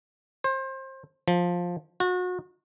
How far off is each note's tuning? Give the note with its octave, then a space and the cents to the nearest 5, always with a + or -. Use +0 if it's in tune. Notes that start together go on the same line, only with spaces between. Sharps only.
C5 +25
F3 +10
F#4 -35